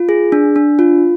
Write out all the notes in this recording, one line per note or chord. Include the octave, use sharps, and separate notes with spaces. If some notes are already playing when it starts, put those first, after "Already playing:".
Already playing: F4
G#4
D4
D4
F4